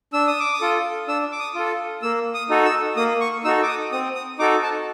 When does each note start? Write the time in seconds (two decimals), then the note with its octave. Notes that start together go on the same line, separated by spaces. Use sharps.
0.13 D4 E6
0.27 D#6
0.40 D6
0.53 D#6
0.61 F4 A4
1.08 D4 E6
1.32 D6
1.39 D#6
1.55 F4 A4
2.02 A#3 E6
2.34 D#6
2.50 D#4 F#4 A4
2.65 E6
2.97 A#3 D#6
3.21 C#6
3.44 D#4 F#4 A4 E6
3.63 D6
3.68 D#6
3.92 C4 D#6
4.15 D#6
4.39 D#4 F#4 A4 D6
4.63 A5